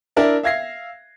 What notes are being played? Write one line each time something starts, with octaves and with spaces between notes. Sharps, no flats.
D4 E4 A#4 D5 E5
E5 F5 G#6 A#6 C7